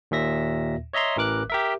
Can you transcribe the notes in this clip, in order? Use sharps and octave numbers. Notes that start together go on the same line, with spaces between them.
D#2 A#2 E5 A#6
C#5 D#5 E5 A#5 C6
A1 E3 A#4 D6 F#6
G4 A#4 E5